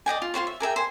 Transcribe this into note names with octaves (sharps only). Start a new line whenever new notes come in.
D5 D#5 G5 G#5
F4
F4 F#4 C5 C#5
E5
G#4 A#4 E5 G5
C5 G#5